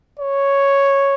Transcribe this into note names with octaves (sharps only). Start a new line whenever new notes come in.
C#5